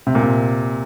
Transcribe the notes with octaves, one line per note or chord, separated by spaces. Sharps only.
C3
A#2
C3